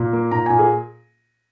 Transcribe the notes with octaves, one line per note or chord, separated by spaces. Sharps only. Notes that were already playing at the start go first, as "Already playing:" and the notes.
Already playing: A#2
A#3
A#2 A#5
A#2 G#5
G#4